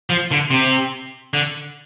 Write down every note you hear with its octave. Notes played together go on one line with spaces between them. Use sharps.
F3
D3
C3
D3